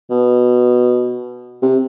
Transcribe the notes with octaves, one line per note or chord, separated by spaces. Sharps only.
B2
C3